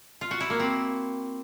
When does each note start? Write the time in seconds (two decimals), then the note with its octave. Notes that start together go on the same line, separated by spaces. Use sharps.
0.21 F4
0.31 F#4
0.40 E4
0.50 A#3
0.60 C4